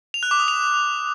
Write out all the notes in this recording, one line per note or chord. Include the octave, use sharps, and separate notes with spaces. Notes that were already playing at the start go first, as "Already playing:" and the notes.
F7
F#6
D6
D#6
F7